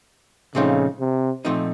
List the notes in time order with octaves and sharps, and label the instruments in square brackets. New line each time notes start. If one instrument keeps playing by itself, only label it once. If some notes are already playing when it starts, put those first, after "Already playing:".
[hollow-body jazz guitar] A#2 F3 A3 C4 D#4 [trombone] C#3
[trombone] C3
[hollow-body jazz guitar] A#2 F3 A3 C4 D#4